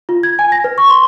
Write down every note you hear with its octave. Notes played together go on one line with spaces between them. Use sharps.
F4
G#6
G#5
A#6
B4
C#6
C6